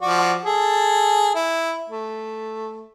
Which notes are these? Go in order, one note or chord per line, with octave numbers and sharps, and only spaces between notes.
F3 F#4 D5
G#4 A4
E4
A3